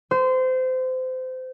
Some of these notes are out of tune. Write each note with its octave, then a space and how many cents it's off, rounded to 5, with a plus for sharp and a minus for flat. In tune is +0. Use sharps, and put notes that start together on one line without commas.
C5 -25